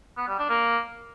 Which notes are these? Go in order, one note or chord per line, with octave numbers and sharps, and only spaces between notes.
B3
G3
D4
A#3